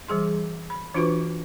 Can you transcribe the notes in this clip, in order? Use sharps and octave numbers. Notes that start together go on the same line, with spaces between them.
E3 G3 G#4 C6
B5
E3 D4 F4 F#4 B4 C#6